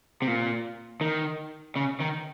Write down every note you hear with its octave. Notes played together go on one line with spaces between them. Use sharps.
C3
A#2
D#3
C#3
D#3